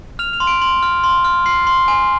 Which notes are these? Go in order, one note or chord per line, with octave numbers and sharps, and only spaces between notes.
F6 F7
F7
C6
D7
C6
F6
C6
F6
C6 C7
C6
G#5